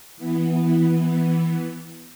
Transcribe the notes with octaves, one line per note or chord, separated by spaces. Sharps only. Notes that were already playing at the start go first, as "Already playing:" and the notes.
E3 B3